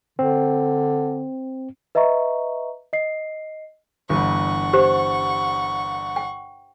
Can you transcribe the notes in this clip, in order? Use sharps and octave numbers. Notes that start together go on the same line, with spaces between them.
D3 C4
B4 D#5 E5 A#5 C#6
D#5 C7
G1 G2 E3 F#5 C#6
G4 C5
G5